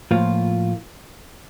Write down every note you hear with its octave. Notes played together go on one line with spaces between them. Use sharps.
A2 F3 A#3 F4